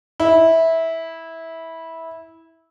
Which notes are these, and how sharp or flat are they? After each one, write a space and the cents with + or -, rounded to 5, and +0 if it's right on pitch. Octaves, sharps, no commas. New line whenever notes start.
E4 -15